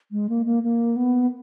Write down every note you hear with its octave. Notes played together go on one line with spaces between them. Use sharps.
G#3
A#3
A#3
A#3
B3